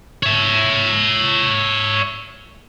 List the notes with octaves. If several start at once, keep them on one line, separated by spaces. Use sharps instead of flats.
C#5 E5